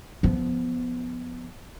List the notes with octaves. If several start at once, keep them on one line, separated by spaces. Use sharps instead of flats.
F3 B3